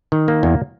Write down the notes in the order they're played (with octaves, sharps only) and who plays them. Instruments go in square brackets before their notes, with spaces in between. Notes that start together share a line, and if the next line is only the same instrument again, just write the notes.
[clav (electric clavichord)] D#3
A#3
E2